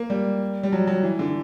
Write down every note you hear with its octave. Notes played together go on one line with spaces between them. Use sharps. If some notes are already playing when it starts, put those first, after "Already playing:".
Already playing: A#3
G3
G3
F#3
F#3
E3
D3